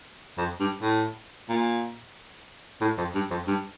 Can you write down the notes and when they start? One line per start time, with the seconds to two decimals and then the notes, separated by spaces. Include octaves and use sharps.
0.38 F2
0.60 G2
0.82 A2
1.49 A#2
2.81 A2
2.98 F2
3.15 G2
3.31 F2
3.47 G2